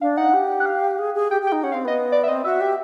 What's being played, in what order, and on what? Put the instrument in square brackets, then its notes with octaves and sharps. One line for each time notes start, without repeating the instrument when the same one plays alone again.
[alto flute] D4 [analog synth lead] F5
[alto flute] D#4 [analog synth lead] F#5
[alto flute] G4
[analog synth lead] F#5
F5
[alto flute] G#4
G#4
[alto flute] G4 [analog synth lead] G5
[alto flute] G4
[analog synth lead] G5
[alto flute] D#4
[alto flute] C#4 [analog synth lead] F#5
[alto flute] C4 [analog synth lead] F5
[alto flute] B3 [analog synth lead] D#5
[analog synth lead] D5
E5
[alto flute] C4 [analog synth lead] D#5
[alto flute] F#4 [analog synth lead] E5
[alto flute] G4